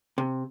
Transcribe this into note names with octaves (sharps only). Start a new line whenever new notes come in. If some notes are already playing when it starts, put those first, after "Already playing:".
C3